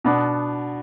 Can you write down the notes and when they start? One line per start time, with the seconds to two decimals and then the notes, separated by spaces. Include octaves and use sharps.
0.04 B2 B3 D4